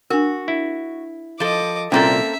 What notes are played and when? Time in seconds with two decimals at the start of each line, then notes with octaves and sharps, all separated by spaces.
0.10 D4 F#4 A#4
0.48 E4
1.40 F3 A4 D#5 D6
1.92 C2 A#2 A#3 C4 C#4 A4 E5 A#5